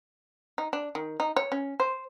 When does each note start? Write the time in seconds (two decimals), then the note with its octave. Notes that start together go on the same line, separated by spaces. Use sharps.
0.58 D#4
0.73 D4
0.95 D#3
1.20 D#4
1.36 C#5
1.52 C#4
1.80 C5